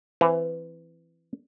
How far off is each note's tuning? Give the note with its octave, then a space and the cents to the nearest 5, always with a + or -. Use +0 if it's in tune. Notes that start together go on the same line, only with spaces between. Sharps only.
E3 +15 C4 +0 A#5 +0